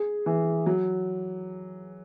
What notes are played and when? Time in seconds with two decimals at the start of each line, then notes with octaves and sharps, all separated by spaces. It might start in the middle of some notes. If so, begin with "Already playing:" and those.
Already playing: G#4
0.26 E3
0.66 F#3